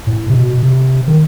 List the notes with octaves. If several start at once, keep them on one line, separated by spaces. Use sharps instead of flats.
A2
C3
B2
C3
D#3